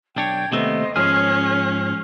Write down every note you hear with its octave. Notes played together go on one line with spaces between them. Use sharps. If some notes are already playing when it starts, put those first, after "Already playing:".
B1 D4 C#5 G5 G6 G#6
D#2 C3 A3 B3 C5 D#5
G#2 F3 C#4 G#4 A#4 C#5 F6 C7